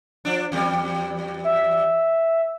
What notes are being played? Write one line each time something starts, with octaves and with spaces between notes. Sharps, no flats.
F3 D4
E2 G3
E5